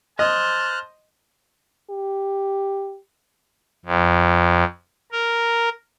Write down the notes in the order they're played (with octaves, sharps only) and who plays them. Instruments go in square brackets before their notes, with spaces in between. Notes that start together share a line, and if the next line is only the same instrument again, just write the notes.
[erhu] C5 [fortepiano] D#5 [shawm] A5 [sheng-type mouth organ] F6 F#6
[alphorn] G4
[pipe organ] F2
A#4